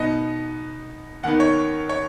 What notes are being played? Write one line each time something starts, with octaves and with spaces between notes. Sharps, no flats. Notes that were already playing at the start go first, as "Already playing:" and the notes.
Already playing: B2 B3 D#4 D#5
D#2 D#3 B3 D#4 F#5
C#5
C#5